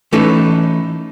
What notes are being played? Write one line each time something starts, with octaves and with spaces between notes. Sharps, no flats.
E3 A3 C#4 D#4 A4 B4